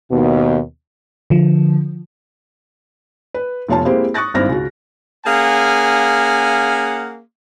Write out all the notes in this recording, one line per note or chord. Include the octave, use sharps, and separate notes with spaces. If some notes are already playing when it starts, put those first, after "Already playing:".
D#2 B2
D3 F3
B4
F1 B2 F4 C#5 F5 A5
G#3 A#3 C4 E4 G4 C5
C#6 D#6 F#6 A6 A#6
G#1 G2 C4 E4 F6 A#6
C#2 F#4
A#3 C#4 G#4 F5 F#5 G#5